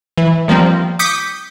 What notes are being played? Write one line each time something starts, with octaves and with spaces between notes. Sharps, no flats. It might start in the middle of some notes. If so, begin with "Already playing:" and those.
E3
D#3 F3 G3 A#3 C4
D6 D#6 G6 B6 C#7